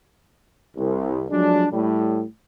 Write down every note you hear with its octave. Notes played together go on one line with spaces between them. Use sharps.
C2
F3 F#3 G#3 A3 D4
A2 G3